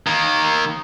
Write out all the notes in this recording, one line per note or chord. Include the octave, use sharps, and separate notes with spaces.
D#3 A#3